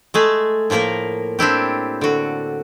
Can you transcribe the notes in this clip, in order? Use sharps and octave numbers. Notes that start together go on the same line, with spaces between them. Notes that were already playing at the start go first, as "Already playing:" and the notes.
G#3 A3 G#4
A2 F3 A#3 A#4 A#5
C4 D4 E4 G4
D3 F#4